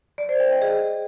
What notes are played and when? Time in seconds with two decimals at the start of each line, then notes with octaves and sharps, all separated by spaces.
0.18 D5
0.29 C5
0.40 G5
0.51 D#5
0.62 G#4